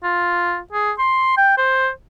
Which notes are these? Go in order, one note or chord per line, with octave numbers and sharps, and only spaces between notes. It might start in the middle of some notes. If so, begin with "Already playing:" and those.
F4
G#4
C6
G5
C5